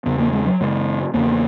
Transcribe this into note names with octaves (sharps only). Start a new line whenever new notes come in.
E2 C#3 B3
A#3
G#3
F#3
F#2 C#3 G#3
E2 C#3 A#3